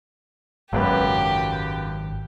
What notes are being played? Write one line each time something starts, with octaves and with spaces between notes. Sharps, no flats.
G#1 C#2 F#2 G4 B4